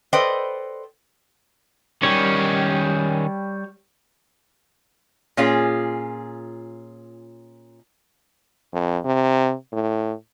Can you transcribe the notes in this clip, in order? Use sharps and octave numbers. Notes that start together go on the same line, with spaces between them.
A4 B4 C5 D5 D#5 G5
D#3 G3 C#4 C#5
A#2 C#4 F4 G#4
F2
C3
A2